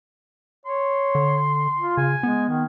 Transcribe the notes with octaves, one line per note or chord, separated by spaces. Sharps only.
C#5 C6
D3
F4
C#3 G#5
G#3 B3
D#3